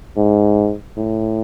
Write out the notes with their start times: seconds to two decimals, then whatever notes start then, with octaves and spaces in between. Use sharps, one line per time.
0.17 G#2
0.98 A2